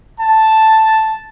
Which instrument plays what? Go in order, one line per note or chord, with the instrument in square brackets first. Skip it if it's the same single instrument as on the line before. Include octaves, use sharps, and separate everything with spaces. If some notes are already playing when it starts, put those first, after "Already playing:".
[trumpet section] A5